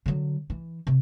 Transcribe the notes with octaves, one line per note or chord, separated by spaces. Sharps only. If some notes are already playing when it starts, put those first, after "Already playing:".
D3 F#3
E3
C3